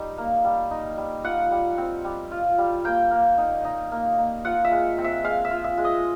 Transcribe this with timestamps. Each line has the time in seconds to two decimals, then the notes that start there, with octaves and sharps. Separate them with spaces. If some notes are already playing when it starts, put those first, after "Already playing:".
Already playing: G3 D#4
0.18 A#3
0.44 G3
0.71 D#4
0.98 G3
1.24 F4 F#5
1.51 G3
1.78 C4
2.04 G3
2.31 F4
2.58 G3
2.84 A#3 G5
3.11 A#3
3.38 D#4
3.65 D#4
3.92 A#3
4.18 A#3
4.45 F4 F#5
4.65 E5
4.71 G#3
4.98 C4
5.04 E5
5.24 G#3 F5
5.45 E5
5.51 F4
5.64 E5
5.78 G#3
5.84 D#5